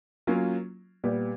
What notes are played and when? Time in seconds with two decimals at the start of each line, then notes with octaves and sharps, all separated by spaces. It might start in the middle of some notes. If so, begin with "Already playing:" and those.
0.27 F#3 A#3 C#4 F4
1.04 A#2 G3 B3